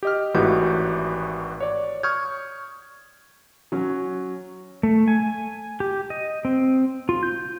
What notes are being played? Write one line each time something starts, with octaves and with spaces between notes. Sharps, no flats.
G4 D#5 F6
G#1 A2 E3 F#4 G4 G6
C#5 D5
C#6 D#6 F6 G6 G#6
F#3 C#4 F#4
A3
G#5
G4
D#5
C4
F4
G6